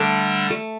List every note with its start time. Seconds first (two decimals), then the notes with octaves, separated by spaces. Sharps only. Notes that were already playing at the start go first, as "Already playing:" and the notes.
Already playing: D3 G3 A3 D4
0.50 A3